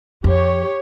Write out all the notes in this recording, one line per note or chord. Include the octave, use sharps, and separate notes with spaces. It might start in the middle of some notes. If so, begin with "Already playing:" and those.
F2 G4 C#5